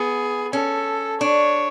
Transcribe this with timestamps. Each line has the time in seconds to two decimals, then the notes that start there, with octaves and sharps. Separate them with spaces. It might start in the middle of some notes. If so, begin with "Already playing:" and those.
Already playing: B3 G#4
0.53 C#4 A4
1.21 D4 C#5